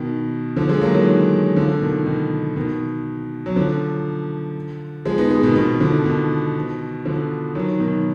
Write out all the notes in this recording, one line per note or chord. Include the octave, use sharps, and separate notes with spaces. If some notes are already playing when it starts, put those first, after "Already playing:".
Already playing: B2 D#3
D3 F3
F3 G#3
F#3 A#3
G#3
D#3 F#3
D3 F3
B2 D#3
B2 D#3
B2 D#3
F#3
D3 F3
F3 G#3
B3 D#4
G#3 B3
B2 D#3
B2 D#3
D3 F3
B2 D#3
D3 F3
D#3 F#3
B2 D#3